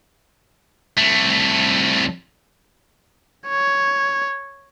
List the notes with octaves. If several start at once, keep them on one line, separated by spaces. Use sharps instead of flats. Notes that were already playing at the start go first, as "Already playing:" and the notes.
C2 A3
C#5